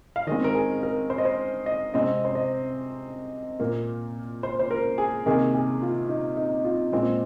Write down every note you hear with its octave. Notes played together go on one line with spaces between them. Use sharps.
F5
D#3 G#3 C4 D#5
A#4
G#4
A#4
C5
D#5
C5
D#5
C3 G#3 C4 D#5
C5
D#5
A#2 A#3
C5
C5
A#4
G#4
C3 D#3 A#3 G#4
G#4
F4
D#4
D#4
F4
A#2 G#3 C4